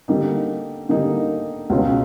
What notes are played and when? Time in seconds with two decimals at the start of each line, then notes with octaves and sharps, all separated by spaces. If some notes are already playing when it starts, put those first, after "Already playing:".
0.08 D3 G3 A#3 D#4
0.89 D3 G3 A#3 D#4
1.70 C#2 B2 G#3 C#4 F4